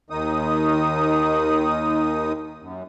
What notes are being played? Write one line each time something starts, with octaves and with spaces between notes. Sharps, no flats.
D#2 D#3 D#4 D#6
F#2